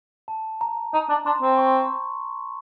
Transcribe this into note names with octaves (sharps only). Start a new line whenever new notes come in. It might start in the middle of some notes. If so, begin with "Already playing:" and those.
A5
A#5
D#4 A#5
D4
D4 C6
C4
C#6